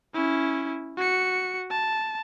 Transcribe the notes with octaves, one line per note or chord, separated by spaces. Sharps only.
C#4 E4
F#4 C#7
A5